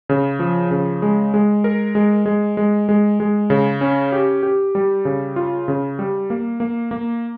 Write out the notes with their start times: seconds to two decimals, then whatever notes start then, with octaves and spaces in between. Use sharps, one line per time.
0.09 C#3
0.39 F3
0.71 C#3
1.02 G#3
1.34 G#3
1.64 A#4
1.95 G#3
2.26 G#3
2.57 G#3
2.89 G#3
3.20 G#3
3.50 C#3
3.81 C#4
4.12 G4
4.43 G4
4.75 G3
5.05 C#3
5.36 F4
5.68 C#3
5.99 G3
6.30 A#3
6.60 A#3
6.91 A#3